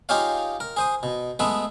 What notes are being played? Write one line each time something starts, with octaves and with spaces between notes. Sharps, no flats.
D#4 F4 G4 G#4 C#5 F5
A#4
G#4 C5 D#6
B2
G#3 A3 B3 G#4 E5